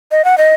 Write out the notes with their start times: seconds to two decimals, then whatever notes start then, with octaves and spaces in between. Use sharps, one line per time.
0.11 D#5
0.25 F#5
0.38 D#5